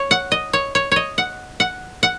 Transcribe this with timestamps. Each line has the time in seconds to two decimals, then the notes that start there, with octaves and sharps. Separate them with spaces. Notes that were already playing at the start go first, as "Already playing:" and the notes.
Already playing: C#5
0.11 F#5
0.32 D#5
0.53 C#5
0.75 C#5
0.92 C#5 D#5
1.18 F#5
1.60 F#5
2.03 F#5